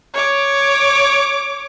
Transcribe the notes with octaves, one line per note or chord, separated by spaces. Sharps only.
C#5 D6